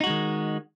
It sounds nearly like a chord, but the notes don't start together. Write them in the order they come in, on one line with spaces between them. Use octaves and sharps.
D#4 F#4 G#3 D#3